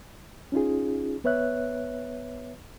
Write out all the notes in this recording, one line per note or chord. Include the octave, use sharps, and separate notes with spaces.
C#4 D#4 F4 G#4
B3 B4 C#5 E5 F#6